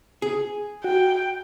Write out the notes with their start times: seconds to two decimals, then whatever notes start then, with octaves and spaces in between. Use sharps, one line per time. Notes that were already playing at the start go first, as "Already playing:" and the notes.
0.22 G#4
0.84 F#4 G5